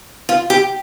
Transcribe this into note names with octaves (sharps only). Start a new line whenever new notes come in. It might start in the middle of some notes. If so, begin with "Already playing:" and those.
F4
G4